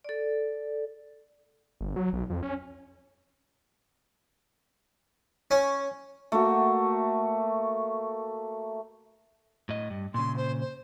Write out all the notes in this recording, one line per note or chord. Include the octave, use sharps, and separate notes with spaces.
A4 D5
G1
F#3
B1
F2
C#4
C#4
A3 A#3 F#4
A2 D#5
G2
A#2 C#3 C6
C5
C5